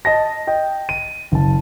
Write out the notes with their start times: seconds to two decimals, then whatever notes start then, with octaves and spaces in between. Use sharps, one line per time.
0.05 D#5 A5 A#6
0.47 D#5 G5
0.89 D#7
1.32 F#1 A5